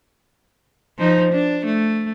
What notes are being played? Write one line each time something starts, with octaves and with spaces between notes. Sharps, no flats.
F3 D#4
D4
A3